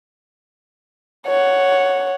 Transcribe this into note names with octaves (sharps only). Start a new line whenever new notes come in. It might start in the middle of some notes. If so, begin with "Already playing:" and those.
C#5 F#5